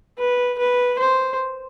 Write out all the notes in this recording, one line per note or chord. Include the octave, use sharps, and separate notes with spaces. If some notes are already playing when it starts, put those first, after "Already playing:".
B4
B4
C5